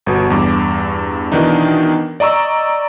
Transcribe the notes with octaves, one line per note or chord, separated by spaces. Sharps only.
G1 B2 F#4
E2 G2 D6
B2 D#3 E3 D4 D#4
D5 D#5 A#5 C#6 E6